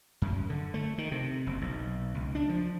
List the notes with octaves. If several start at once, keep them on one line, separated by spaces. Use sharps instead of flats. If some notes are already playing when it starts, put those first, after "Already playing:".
F#2
D3
A3
D#3
C3
F#1
B1
C#2
D4
F3